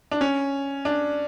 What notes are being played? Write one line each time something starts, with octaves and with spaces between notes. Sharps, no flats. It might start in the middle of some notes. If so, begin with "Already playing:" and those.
D4
C#4
D4